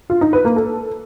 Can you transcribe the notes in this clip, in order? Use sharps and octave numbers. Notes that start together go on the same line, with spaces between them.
F4
D#4
B4
A#3
A4